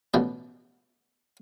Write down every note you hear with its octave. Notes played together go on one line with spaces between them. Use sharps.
A1 B2 D5